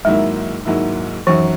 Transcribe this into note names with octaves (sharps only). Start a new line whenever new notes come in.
G#2 D#3 F#3 G#3 A#3 E4
G#2 D#3 F#3 A#3 E4
F#2 D#3 E3 F#3